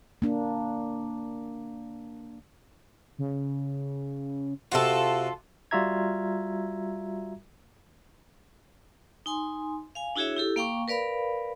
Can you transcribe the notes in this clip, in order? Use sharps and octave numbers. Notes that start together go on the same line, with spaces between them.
A#3 D4
C#3
C3 F4 F#4 A4
G3 F4 F#4 E5 A#5 G#6
D#4 G#5 C6
F5 G#5
D4 E4 F#4 G#4 C#5 E5
E4 G4 A4
A#3 F5 G5 A#5 C#6 D6
A#4 B4 D5 F5 B5